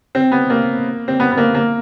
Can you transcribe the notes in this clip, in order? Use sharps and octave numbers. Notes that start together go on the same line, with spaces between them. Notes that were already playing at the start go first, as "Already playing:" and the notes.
C4
B3
A#3
C4
B3
B3
A#3
A#3